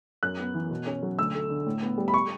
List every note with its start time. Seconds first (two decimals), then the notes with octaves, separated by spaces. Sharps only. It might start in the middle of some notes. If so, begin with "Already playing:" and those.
0.23 F#2 F#6
0.39 B3
0.54 E3
0.71 B2
0.87 C#4
1.03 F#3
1.19 D2 E6
1.34 A3
1.50 D3
1.66 A2
1.82 B3
1.98 G3
2.08 B5
2.14 C#6